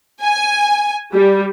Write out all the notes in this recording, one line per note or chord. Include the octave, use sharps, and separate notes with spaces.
G#5
G3